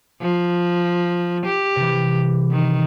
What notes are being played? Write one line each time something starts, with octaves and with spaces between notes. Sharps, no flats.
F3
G4
C3 E3
D#3